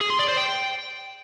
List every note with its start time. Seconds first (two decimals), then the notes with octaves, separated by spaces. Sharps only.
0.01 G#4
0.10 C6
0.19 D5
0.28 C5
0.37 G5